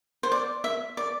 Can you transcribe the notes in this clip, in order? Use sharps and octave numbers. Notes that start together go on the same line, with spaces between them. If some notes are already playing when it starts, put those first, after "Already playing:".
C5
D5
E5
D5